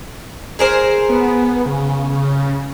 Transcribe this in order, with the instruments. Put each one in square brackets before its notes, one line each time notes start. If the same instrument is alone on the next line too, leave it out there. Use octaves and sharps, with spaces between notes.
[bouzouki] G#4 A#4 C5
[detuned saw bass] B3
C#3
C#3